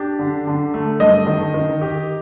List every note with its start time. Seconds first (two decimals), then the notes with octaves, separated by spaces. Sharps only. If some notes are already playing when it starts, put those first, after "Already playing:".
Already playing: D4 G4
0.19 D3
0.47 D3
0.74 A3
1.00 G2 D#5
1.27 D#3
1.54 D#3
1.81 G4